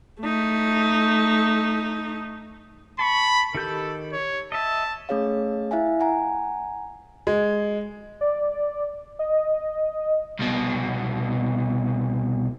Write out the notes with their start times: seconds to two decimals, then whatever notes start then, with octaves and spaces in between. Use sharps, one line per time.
0.21 A3 D#4
2.99 A5 B5 C#6
3.55 D#3 G4 A4 G6
4.13 C#5
4.52 D#5 E5 A5
5.09 A3 C#4 G#4 C#5 F5
5.71 E4 E5 F5 G#5
6.00 F#5 G#5 A#5
7.27 G#3
8.21 D5
9.19 D#5
10.40 C2 B2